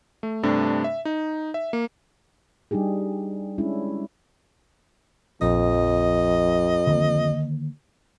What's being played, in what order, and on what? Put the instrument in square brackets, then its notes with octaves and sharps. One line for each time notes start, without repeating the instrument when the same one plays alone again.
[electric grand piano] A3
G2 C3 A3 D4
E5
D#4
E5
A#3
[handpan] G3 D4 D#4 G4 G#4
G#3 C#4 D4 E4
[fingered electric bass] A#1 [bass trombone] F2 [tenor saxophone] D#5
[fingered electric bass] D3 D#3 A#3